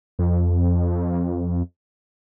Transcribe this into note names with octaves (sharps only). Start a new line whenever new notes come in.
F2